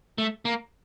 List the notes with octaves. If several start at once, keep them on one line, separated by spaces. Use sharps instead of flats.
A3
A#3